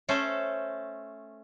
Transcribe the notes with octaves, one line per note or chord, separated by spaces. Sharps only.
A3 C#4 A4 C5